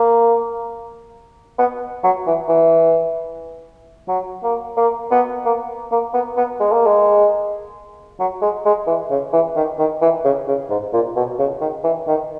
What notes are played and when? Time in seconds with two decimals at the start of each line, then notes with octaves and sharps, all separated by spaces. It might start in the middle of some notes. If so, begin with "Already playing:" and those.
Already playing: A#3
1.59 B3
2.04 F#3
2.27 E3
2.49 E3
4.08 F#3
4.44 A#3
4.77 A#3
5.11 B3
5.45 A#3
5.92 A#3
6.14 B3
6.37 B3
6.60 G#3
6.73 A#3
6.86 G#3
8.20 F#3
8.42 G#3
8.66 G#3
8.87 E3
9.11 C#3
9.33 E3
9.56 D#3
9.79 D#3
10.02 E3
10.25 C#3
10.48 C#3
10.70 G#2
10.93 A#2
11.16 B2
11.39 C#3
11.61 D#3
11.84 E3
12.08 D#3